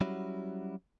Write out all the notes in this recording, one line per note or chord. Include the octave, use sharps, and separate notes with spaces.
F#3 G3 C#4 E4 F#4